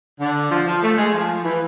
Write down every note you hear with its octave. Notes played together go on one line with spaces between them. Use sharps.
D3
F3
F3
A3
G#3
F3
E3